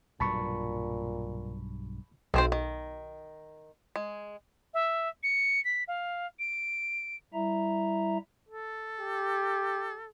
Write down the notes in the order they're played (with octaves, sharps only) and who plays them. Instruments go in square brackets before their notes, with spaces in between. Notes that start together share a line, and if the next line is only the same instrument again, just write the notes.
[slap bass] B1 G2 F#3 [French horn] A#2 [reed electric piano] A5 B5 C#6
[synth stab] B1 [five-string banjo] D#3 C4 C5
[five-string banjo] D#3
G#3
[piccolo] E5
C#7
B6
F5
D7
[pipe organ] G3 E4 E5 A#5
[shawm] A4
[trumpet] G4